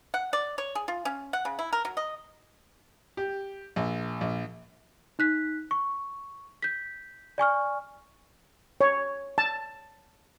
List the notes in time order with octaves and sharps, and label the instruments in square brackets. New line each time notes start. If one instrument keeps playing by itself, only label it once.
[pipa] F#5
D5
C#5
G#4
F4
C#4
F#5
C#3
E4
A#4
F#3
D#5
[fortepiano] G4
A#1
A#1
[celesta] D#4 F#6 B6
C#6
G6 B6
D5 G#5 C#6 F6
[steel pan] C#5
A5